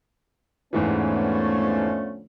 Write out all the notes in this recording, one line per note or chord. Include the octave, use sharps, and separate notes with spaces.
E2 G#2 D3 E3 F3 A3 B3 C#4